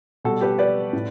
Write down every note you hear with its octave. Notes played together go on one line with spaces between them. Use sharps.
B2 G3 F#4 A4
G4 B4
B4 D5
A2